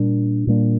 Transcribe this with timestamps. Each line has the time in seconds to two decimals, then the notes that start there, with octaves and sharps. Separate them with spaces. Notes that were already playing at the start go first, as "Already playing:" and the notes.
Already playing: A#2 G3 D4
0.47 A#2 G3 A#3 D4